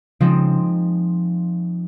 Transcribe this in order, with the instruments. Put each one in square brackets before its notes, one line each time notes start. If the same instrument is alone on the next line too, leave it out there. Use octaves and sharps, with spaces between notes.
[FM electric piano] C#3 [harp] F3 G#3 C4 D#4